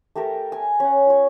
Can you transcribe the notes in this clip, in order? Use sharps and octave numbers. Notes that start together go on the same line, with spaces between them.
A3 G4 A4 A#4
G#5
C#4 F#5
F4 C#5